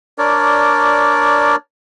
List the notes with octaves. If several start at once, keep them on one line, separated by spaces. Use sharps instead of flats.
D4 A#4 C#5 D5